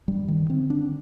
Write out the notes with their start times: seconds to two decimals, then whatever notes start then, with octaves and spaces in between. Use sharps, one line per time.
0.08 G2 G3
0.28 D#3
0.50 D3 C4
0.70 D4